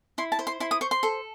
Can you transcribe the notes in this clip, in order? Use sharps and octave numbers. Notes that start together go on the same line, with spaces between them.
E4 C6
A5
C5
C6
E4 C6
D#6
C5 C#6
C6
A4